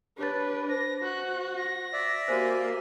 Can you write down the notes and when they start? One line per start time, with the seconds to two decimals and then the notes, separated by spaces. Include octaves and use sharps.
0.18 D4 G4 B4 C#5 A6
0.69 C5 A#6
1.03 F#4 F#6
1.56 A#6
1.93 D5 E5
2.28 A#3 F#4 G4 C5 G#5